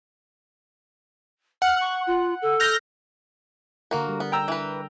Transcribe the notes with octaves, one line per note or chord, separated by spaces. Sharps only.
F#5 F6
C#6
F4
A4
F6 G6 A#6
D3 A#3 F#4 A#4
G3
B3
G5 A#5 E6
E3 B4